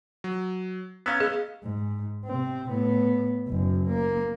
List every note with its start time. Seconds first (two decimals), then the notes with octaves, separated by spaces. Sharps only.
0.24 F#3
1.06 B3 C#4 F5 A#5 E6
1.20 G#4 D#5 F5
1.64 G#2
2.26 C3 C4
2.69 A2 B3
3.48 F#1 F#2
3.88 A#3